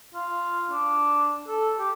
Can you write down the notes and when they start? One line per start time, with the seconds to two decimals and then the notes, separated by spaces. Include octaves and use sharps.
0.14 F4
0.70 D4
1.47 A4
1.78 G4